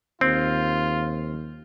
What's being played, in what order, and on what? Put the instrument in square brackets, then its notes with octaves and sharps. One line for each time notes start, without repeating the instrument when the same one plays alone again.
[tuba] D#2 [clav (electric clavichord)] C4 [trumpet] F4